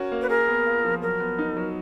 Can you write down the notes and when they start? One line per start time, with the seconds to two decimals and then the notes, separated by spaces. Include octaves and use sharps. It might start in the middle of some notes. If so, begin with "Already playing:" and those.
Already playing: C#4 F#4 A#4
0.12 A#3
0.22 B4
0.30 G#4 A#4
0.47 B3
0.66 F4
0.85 F3
1.02 F#3 A#4
1.20 B3
1.38 D#4
1.57 F#3